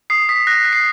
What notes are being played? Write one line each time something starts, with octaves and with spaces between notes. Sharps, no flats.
D#6 C7
D#6 B6
F#6 A#6
F#6
C7